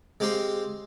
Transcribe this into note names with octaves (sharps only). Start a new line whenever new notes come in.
G#3 C4 G4 F5 C6